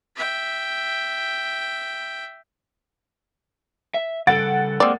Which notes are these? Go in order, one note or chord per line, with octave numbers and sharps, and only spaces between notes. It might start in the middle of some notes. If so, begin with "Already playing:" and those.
E5 G5
E5
C#3 G3 A4 F#5 A6 D7
G#3 A#3 C4 D5